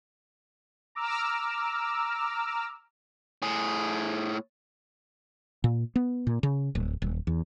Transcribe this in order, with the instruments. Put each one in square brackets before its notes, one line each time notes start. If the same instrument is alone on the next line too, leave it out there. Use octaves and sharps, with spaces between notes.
[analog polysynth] A#5 D6 E6 F6
[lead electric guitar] A2 G#4
[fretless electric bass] A#2
B3
A#2
C#3
D1
D#1
E2